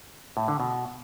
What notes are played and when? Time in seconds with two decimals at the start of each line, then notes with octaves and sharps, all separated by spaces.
0.37 A2
0.48 D3
0.60 B2